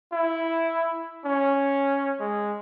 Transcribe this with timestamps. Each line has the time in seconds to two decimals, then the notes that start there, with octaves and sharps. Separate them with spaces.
0.13 E4
1.25 C#4
2.20 G#3